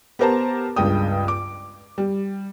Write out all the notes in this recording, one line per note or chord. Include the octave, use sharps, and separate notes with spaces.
B3 G4 A#4 C5 A5 A#5
C#2 G2 G#3 G5 D#6
D6
G3